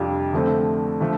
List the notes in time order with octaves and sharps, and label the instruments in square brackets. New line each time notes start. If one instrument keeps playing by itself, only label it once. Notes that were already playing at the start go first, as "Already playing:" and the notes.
Already playing: [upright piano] F2 C3 G3 D4 F4
D3 F3 A3 C4
D3 F3 A3